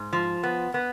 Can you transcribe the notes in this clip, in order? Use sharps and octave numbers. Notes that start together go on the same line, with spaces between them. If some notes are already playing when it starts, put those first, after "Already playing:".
Already playing: G#2
F3
B3
B3